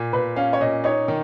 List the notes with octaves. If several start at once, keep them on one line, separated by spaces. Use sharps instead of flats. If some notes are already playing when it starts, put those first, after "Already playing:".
Already playing: A#2
A#2 B4
C#4 F5
C#5
A#2 D#5
D#4 C#5
D#3